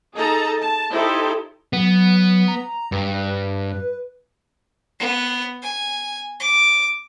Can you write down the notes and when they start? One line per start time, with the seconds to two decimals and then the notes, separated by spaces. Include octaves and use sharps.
0.15 D#4 G#4 A4 A5 A#5
0.60 A5
0.92 D#4 E4 G4 A4 C5
1.73 F#3 B3
2.48 A#5
2.92 G2 B4
4.99 B3
5.62 G#5
6.40 D6